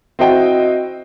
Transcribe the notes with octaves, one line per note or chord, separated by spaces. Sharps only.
C4 E4 F#4 D#5 G5